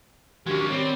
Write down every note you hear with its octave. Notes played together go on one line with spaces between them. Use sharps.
D#3 F#3 G#3 C#4 D4 G4
G3 C4 C#5